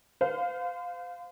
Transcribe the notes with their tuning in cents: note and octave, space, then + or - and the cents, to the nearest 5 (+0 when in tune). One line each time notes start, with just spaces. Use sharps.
C5 -40 F5 +10